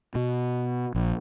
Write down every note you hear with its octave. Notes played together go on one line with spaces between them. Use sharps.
B2
A#1